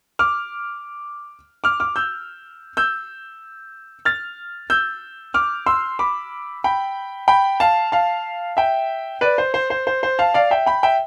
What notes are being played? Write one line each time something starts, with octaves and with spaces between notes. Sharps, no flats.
D6 F6
D6 F6
D6 F6
E6 G6
E6 G6
F6 A6
E6 G6
D6 F6
C6 E6
B5 D6
G5 B5
G5 B5
F5 A5
F5 A5
E5 G5
B4 D5
C5
C5
C5
C5
C5
F5 A5
D5 F5
E5 G5
G5 B5
E5 G5